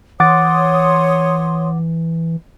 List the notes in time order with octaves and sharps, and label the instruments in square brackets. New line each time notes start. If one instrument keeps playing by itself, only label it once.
[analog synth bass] E3 [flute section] C#5 C6 D#6 [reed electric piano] F#5 D6 A6